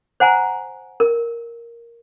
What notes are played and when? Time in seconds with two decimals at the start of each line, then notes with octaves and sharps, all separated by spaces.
0.20 C5 F#5 G#5 A#5
1.00 A#4